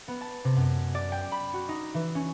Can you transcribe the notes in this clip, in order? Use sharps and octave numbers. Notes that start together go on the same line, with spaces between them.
B3
A5
C3
F#2
D5
G5
B5
F#4
D#4
E3
C#4